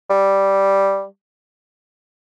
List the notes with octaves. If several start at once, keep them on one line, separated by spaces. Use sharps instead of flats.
G3